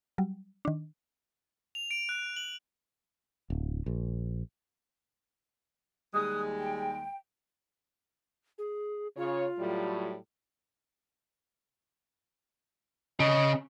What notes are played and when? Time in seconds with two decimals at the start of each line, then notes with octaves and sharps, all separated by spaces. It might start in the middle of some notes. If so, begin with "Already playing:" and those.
0.18 F#3 G3
0.65 D#3 D4
1.75 F7
1.91 D7
2.09 F#6
2.36 F#7
3.50 D1
3.86 A#1
6.14 D#2 G3 G#3 D#6 F#6
6.58 G5
8.58 G#4
9.17 C#3 F4 C#5
9.59 A2 F#3 G3
13.20 C#3 D#5